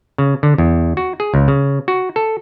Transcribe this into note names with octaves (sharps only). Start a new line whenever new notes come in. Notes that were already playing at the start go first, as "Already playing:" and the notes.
C#3
D3
E2
F#4
G#4
C#2
C#3
F#4
A4